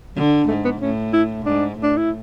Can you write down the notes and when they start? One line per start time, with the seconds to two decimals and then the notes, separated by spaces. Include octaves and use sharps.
0.16 D3 F#3
0.48 G#2 A3
0.65 B3
0.81 A2 C#4
1.13 E4
1.45 G#2 D4
1.78 A2 D4
1.97 E4